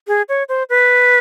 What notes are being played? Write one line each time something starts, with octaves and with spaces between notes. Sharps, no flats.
G#4
C#5
C5
B4